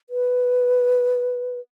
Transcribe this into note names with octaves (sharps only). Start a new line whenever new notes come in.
B4